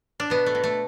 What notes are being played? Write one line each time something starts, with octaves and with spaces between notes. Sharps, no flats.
D4
B2 B3
A3
B2
A3